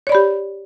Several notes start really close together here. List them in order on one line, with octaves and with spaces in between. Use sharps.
C#5 D5 B5 G4